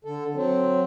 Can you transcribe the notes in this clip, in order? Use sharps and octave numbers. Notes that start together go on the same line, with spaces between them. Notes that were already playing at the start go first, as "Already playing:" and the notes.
D3 A4
F#3 C4